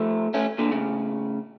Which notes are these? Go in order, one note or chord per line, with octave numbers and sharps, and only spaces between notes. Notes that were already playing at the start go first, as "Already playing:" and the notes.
Already playing: F3 A3
A3 C#4
A#2 D3
A2 C#3